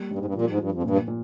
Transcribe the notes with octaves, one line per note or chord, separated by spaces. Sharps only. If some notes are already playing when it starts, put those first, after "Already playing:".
Already playing: G3 A#3
G2 G3
G#2
G2
A#2 F3
G#2
G2 F3
F2
G2 A#2
A#2